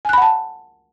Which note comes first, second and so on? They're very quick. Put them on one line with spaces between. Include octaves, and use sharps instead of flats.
G#5 F#6 B5 F#5 A5